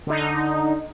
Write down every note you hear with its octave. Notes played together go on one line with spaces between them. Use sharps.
D3 D#4